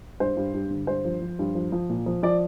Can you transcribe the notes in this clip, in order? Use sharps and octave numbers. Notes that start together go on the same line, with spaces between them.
G2 C5
G2
G2
D3
G2 C5
F3
F3
G2
F3
F3
A#2
F3
F3 D5